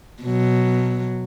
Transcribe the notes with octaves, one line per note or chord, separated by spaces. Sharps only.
B2 F#3